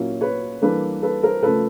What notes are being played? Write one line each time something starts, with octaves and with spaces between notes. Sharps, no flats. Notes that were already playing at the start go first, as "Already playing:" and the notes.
Already playing: A#2 F#3 A#3 C#4 E4
B4 C#5
E3 G3 A#3 D4 A4 B4
A4 B4
A#4 C5
C#3 F3 A3 A4 B4